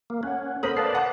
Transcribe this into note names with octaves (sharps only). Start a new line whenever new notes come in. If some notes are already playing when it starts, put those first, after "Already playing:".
A#3
C#4 F#5 F#6
A3 A#4 C5 B5 D#6
B4 D5 F5 A5 C7
F#5